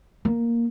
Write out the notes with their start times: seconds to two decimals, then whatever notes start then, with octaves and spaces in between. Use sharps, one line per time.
0.25 A#3